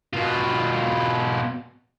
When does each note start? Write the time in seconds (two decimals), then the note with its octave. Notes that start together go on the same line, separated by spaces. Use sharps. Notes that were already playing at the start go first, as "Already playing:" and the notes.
0.13 B2 F4